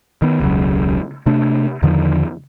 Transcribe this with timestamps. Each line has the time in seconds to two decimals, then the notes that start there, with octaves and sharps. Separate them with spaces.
0.22 D#3 B3
0.40 E1 C#2 C#3 F#3
1.26 C3 A3 D4
1.82 E2 D3 D#3 F3